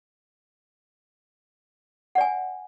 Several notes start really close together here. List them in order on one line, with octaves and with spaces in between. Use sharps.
F#5 D5 G#5